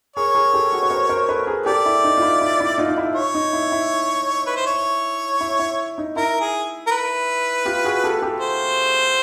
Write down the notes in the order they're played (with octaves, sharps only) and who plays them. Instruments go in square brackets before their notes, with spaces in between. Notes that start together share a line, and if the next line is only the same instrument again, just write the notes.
[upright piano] G#4 A#4 [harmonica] C#5
[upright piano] G#4 A#4
G4 A4
F#4 G#4
B4
A#4 C5
A#4 C5
A4 B4
G#4 A#4
[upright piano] G4 A4 [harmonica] D5
[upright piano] E4
D#4
F4
E4
E4
E4
D#4 F4
D#4
E4
[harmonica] C#5
[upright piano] D#4
E4
E4
[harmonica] B4
C5
C#5
[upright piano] E4
E4
D#4
[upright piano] E4 [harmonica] A#4
[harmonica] G#4
A#4
B4
[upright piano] F4 G4
F#4 G#4
G4 A4
G4 A4
[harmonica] C5